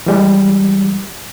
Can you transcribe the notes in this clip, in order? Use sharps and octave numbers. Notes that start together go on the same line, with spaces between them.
E3 G3 G#3